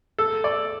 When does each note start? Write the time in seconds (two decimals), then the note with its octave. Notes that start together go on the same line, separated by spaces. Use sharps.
0.18 A4
0.44 D5